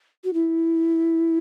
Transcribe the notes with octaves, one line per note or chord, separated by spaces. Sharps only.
F#4
E4